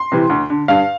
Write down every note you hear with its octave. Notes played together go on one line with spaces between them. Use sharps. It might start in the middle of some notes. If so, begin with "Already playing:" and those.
Already playing: C6
C3 E3
D2
D3
G2 F5